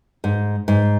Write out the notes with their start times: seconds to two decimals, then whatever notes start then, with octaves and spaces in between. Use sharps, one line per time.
0.24 G#2
0.68 G#2